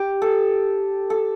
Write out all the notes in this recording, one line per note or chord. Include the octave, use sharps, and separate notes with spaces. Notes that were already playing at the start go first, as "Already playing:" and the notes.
Already playing: G4
A4
A4